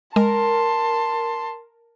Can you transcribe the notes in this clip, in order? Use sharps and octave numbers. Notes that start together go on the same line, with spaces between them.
G#3 A#4 A5 C6